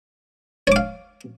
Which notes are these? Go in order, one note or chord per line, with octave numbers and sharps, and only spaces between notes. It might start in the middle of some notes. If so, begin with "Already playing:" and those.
C#5 F5 D6